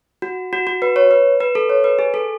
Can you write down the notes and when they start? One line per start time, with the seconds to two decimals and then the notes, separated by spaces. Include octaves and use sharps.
0.22 F#4
0.53 F#4
0.67 F#4
0.82 B4
0.96 C#5
1.11 B4
1.40 B4
1.55 A4
1.69 C#5
1.84 B4
1.99 G#4
2.14 A4